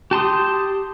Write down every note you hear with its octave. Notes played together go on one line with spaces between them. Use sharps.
G4 A5 C6 D#6